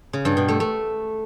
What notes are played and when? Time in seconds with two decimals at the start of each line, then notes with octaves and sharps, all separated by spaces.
0.13 C#3
0.25 G2
0.37 B2
0.48 A3
0.60 A3